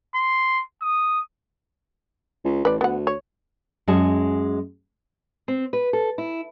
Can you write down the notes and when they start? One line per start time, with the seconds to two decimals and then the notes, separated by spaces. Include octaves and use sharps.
0.14 C6
0.82 D#6
2.45 C#2
2.65 A1 B4 D5
2.81 D2 B3 F#5
3.07 C#5
3.88 F#2 G#3 F#4 G#4 A5
5.48 C4
5.73 B4
5.93 A4
6.18 E4